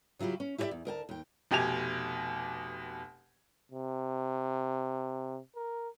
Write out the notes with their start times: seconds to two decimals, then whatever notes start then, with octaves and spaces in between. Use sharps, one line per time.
0.19 C#3 F#3 E4 F4 G4
0.40 C#4
0.58 E4 G4 G#4 C#5 D5 E5
0.71 E2
0.85 D2 A#4 G5 A5
1.09 D#2 G5
1.51 F1 B2 G4 G#5 G#6 F7
3.72 C3
5.56 A#4